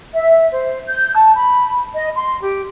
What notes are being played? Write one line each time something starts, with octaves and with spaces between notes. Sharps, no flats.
E5
C5
G6
A5
B5
D#5
C6
G4